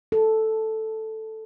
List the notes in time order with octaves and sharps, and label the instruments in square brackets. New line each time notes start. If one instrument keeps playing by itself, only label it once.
[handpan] A4